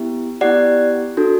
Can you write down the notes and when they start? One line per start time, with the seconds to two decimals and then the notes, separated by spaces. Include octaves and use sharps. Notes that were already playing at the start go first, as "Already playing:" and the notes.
Already playing: B3 E4 G4
0.41 B3 E4 G4 D5 F#5
1.17 D4 F#4 A4